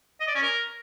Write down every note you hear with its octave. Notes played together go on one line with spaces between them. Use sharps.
D#5
D5
C#4
A#4